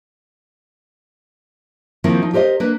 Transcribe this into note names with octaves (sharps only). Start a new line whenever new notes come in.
D#3 F3 A#3 C4 E4
F3 D#4
G4 A#4 C5 D5 D#5
A#3 D4 B4